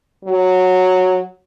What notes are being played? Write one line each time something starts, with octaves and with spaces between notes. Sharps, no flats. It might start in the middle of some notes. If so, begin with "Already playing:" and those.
F#3